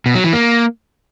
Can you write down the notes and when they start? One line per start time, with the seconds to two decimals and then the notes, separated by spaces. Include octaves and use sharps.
0.06 B2
0.15 F#3
0.24 E3
0.33 A#3